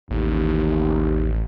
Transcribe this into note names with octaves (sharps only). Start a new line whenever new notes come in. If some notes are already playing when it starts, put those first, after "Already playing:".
A1 D#2